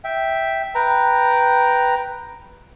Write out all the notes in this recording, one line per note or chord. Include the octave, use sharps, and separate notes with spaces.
E5 G5
B4 G5 A#5